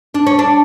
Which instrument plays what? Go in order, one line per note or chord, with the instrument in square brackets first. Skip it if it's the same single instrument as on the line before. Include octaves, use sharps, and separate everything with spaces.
[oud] D4
C#4
D4